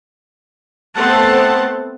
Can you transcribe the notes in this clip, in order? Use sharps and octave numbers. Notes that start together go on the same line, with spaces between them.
A3 B3 C4 C5 F#5 A5